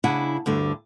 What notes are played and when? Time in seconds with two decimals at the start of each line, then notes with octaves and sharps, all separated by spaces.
0.04 C#3 D4 E4 F#5 G#5
0.46 D2 G2 D3